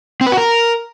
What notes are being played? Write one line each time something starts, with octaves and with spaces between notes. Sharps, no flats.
C4
B4
F#4
A#4